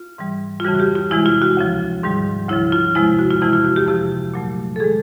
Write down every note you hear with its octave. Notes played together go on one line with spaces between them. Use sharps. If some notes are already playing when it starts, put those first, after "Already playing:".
Already playing: F4
G#2 E3 G3
F4
F2 C#3 E3 G3 F#4
F#4
G4
F4
E2 C3 E3 G#3 E4
F4
F#4
D2 C#3 F3
G#2 D#3 G3
D2 C#3 F3 E4
F4
E2 C3 F3 G#3 E4
F#4
F4
F2 C3 E3 G#3 E4
F4
F#4
G4
F2 C3 F3 G4
A#2 F#3 A3
A4
D#3 G#3 G#4